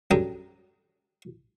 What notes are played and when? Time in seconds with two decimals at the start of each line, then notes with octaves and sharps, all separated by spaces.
0.11 F#2 G3 D4 A4 A#5 D#6